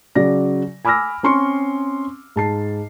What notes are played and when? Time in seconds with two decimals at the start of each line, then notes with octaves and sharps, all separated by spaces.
0.15 C#3 F#3 D5 A#6
0.85 G#5 B5 D6 E6 F6 A#6
1.23 C4 C#4 C6 C#6 C#7
2.36 G#2 A5 C7